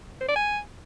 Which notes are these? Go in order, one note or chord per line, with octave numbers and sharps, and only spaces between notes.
C5
D5
G#5